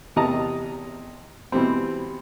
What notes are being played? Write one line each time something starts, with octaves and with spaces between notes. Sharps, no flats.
E2 C3 D#5 A5 A#5 D#6
B2 E3 G3 C4